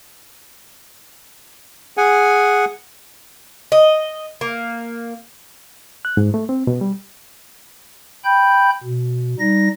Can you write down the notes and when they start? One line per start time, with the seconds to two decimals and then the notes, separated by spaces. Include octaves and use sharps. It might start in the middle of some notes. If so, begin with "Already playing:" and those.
1.97 G#4 F#5 G#5
3.72 D#5
4.41 A#3
6.05 F#6
6.17 G#2
6.34 A3
6.49 C4
6.67 B2
6.81 G3
8.24 G5 B5 G6
8.83 B2
9.39 G3 D#4 A#6